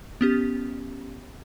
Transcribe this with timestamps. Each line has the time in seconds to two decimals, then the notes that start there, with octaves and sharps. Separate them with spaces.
0.21 B3 C#4 G4